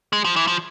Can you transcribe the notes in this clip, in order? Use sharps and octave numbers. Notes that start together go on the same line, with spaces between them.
G#3
F3
E3
F3